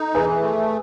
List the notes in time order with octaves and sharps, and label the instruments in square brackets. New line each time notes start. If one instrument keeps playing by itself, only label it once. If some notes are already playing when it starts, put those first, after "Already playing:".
Already playing: [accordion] D#4 [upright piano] A4
[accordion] E3 [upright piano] G#4 B4
[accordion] A3